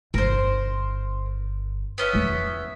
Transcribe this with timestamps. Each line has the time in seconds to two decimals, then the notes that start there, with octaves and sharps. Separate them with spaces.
0.14 G1 A#4 C5
1.98 B3 C#4 E5
2.13 E2 E4